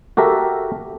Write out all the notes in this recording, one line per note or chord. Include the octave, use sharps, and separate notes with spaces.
F#4 G4 A4 A#4 E5